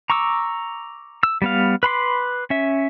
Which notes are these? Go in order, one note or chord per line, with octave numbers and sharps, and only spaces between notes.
A#5 C#6 D6 E6
E6
G3 B3 F5
B4 B5 C6 D6
C#4 E5